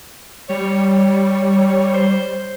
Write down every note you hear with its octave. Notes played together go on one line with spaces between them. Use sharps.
G3 C#5
C5